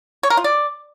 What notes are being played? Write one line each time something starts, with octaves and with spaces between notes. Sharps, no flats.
C#5
A#4
F4
D5